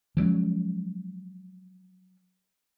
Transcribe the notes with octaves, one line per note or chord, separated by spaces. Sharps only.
F3 F#3 G#3 C#4